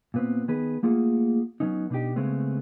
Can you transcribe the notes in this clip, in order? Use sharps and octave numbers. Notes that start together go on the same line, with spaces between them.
A#2 B3 C4
D#3 B3 G#4 B4
A3 A#3 F4 G#4 F#5
F#3 B3 C#4 D#4
B2 D4 D#4 G4
C#3 G#3 A3 B3 C4